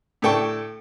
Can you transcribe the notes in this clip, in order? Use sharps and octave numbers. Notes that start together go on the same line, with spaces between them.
A2 D4 A4 G5 C#6